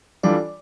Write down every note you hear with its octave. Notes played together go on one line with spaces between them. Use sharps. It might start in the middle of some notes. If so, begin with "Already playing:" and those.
E3 G3 D4 F4 A4 D5